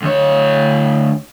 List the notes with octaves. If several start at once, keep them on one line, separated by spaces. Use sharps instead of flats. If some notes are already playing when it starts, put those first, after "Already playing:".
D2 C#5